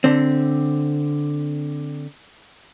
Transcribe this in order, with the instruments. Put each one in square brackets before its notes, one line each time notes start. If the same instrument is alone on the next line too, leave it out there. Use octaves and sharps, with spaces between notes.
[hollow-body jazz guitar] D3 C4